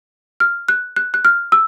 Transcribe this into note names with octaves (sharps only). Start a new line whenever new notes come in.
F6
F#6
F#6
F#6
F6
E6